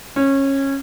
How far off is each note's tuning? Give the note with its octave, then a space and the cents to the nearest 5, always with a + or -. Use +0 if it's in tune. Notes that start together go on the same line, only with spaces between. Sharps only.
C#4 -20